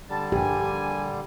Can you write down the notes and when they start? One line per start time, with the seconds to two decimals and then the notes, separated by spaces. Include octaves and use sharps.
0.09 D3 G3 A5
0.32 A#1 G2 G4 G#5